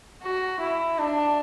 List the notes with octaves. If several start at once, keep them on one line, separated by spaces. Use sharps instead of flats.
F#4
E4
D4